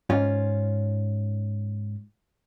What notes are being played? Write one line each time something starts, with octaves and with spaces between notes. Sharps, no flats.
G#2 C#4 F4